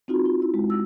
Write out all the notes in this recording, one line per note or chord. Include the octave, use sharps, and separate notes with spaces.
C4 D#4 F4 F#4
F4
E4
G#3
E6